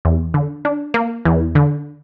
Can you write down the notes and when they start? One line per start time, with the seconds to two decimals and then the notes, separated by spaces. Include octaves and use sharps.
0.05 E2
0.34 D3
0.65 D4
0.94 A#3
1.25 E2
1.55 D3